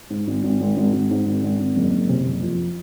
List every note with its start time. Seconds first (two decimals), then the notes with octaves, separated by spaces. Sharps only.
0.10 G#2
0.27 G#1
0.44 G#1
0.61 G#1
0.77 G#1
0.93 G#1
1.11 G#2
1.27 G#1
1.43 G#1
1.60 G#1
1.76 F#1
1.93 F#1
2.09 C3
2.26 F#1
2.42 F2